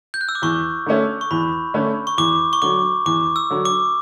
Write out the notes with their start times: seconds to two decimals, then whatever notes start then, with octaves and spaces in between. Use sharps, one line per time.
0.14 G6
0.21 F#6
0.29 E6
0.35 D6
0.42 E2 C#6
0.86 D3 A3 C#4
1.21 C#6
1.31 E2 B5
1.74 D3 A3 C#4
2.07 C#6
2.18 E2 D6
2.53 C#6
2.62 D3 F#3 D6
3.06 E2 D6
3.36 E6
3.50 D3 F#3
3.65 D6